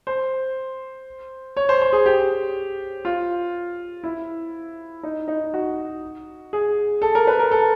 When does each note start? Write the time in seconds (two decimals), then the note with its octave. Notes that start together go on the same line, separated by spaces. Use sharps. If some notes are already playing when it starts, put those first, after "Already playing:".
0.07 C5
1.57 C#5
1.69 C5
1.81 C5
1.93 G#4
2.06 G4
3.05 F4
4.04 E4
5.03 D#4
5.28 D#4
5.54 F#4
6.53 G#4
7.02 A4
7.15 A#4
7.27 B4
7.39 A#4
7.51 A4